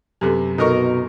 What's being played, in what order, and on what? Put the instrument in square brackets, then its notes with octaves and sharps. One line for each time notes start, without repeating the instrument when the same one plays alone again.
[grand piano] F#2 C3 B3 [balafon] G4 A4
[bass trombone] B2 [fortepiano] D#4 A#4 C#6 [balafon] A4 D#5